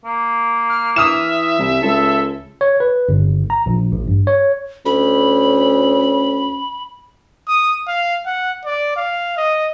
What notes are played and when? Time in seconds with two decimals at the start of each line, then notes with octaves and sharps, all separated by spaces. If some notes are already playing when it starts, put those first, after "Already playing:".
0.05 A#3
0.69 F6
0.96 E3 E5 D#6 F6 E7
1.59 C2
1.82 C#2 A4
2.61 C#5
2.80 B4
3.09 G1
3.50 A#5
3.66 A#1
3.92 A1
4.08 G2
4.27 C#5
4.86 D2 C#4 B5
7.48 D#6
7.88 F5
8.26 F#5
8.65 D5
8.96 F5
9.37 D#5